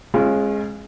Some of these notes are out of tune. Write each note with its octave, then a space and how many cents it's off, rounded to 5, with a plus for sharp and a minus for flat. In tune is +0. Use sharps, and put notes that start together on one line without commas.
G#3 +0 C#4 -40 F4 -20